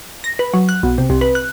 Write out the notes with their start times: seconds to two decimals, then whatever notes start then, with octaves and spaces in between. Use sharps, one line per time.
0.24 A#6
0.39 B4
0.53 F#3
0.69 F#6
0.83 B1
0.98 C3
1.10 C2
1.21 B4
1.35 F#6